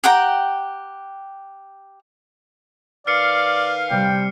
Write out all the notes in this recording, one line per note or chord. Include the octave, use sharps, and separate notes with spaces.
G4 F#5 G5 A#5
D#3 B4 D5 F5 F6 C7 C#7
C3 G3 G5